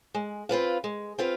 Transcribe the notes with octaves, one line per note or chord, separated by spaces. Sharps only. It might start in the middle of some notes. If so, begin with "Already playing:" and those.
G#3
C4 F4 B4 F5
G#3
C4 F4 B4 F5